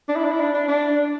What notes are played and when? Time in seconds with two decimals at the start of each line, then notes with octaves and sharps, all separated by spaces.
0.08 D4
0.16 E4
0.25 D4
0.32 E4
0.40 D4
0.54 D4
0.68 D4